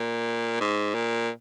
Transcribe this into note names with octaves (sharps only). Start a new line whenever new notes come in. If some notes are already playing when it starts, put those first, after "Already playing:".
Already playing: A#2
G#2
A#2